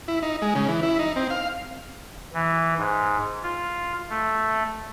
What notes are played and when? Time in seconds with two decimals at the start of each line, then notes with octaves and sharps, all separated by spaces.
0.08 E4
0.23 D#4
0.42 G#3
0.55 C#3
0.68 E3
0.83 E4
0.99 D#4
1.16 C4
1.30 F5
2.33 E3
2.77 G#2
3.43 F4
4.10 A3